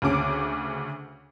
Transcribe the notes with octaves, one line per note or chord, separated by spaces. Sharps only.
D2 C#3 C#4 D6 D7